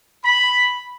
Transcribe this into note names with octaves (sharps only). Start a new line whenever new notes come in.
B5